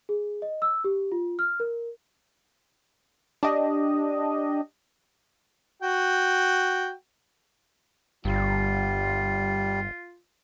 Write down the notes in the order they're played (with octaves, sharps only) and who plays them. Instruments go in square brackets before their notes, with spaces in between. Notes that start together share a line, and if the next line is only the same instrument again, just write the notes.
[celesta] G#4
D#5
E6
G4
F4
F6
A#4
[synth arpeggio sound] D4 G4 D#5
[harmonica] F#4 G5
[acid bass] G1 [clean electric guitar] G2 [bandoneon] G3 [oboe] F4